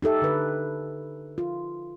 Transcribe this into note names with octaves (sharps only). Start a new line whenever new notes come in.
D#4 G4 A4 E5
D3 B4
F4